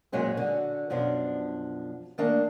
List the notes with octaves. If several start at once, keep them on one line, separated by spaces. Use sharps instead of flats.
F2 A#2 F#3 G#3 C#4
D3 F#4
F#2 B2 F3 D4
D#3 A3 A#3 D4 A5